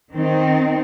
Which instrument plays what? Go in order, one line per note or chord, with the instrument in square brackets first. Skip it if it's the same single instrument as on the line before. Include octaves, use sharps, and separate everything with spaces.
[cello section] D#3 C4 D#4